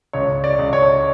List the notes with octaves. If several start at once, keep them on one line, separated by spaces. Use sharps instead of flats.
C#2 C#5
D5
C#2
C#5